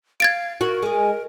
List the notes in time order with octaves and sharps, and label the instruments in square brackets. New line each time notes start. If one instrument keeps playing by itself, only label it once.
[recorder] F5 [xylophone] G#6 A6 D7
[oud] F#4 [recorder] A#4
[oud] G#3 G#4